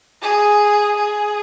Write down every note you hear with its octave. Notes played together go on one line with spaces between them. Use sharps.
G#4
G#4